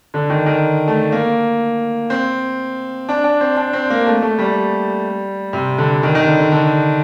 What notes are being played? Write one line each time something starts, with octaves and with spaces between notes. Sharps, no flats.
D3
D#3
D#3
A3
A#3
C4
D4
D4
C4
D4
C4
A#3
A3
A3
G3
C3
D3
D#3
D#3
D3
D3
D3